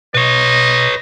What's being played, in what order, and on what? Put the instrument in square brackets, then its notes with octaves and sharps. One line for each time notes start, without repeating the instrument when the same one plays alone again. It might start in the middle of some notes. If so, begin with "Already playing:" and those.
[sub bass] B2 [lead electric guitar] B4 C#5 [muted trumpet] D#5